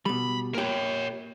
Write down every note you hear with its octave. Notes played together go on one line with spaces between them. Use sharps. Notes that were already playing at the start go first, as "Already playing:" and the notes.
B2 G3 B5
A#2 G4 A#4 C#5